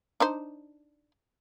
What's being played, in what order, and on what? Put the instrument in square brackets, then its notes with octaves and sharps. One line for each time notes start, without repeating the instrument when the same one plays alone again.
[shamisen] D4 D#4 C5